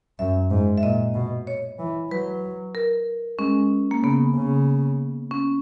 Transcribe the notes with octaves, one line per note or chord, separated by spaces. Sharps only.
F#2 E5
G#2
E5
A#2 D#5
B2
C#5
E3
F#3 B4
A#4
G#3 C#4
A#3
C#3 B3
C#3
C#4